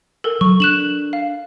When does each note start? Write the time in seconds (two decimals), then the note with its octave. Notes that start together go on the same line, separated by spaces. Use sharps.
0.24 A4 A#4
0.41 F#3 C#6
0.60 D4 F#6 E7 F#7
1.13 F5